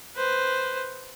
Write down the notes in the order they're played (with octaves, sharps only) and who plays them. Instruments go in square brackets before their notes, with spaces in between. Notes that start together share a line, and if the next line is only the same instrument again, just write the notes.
[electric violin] B4 C5